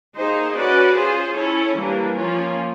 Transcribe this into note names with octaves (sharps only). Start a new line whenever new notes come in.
A#3 D#4 G#4 C5
C#4 F#4 B4 D5
C#4 F4 G#4 C5
C#4 E4 A4 C#5
E3 G3 A#3 D4
F3 A#3 C#4 F4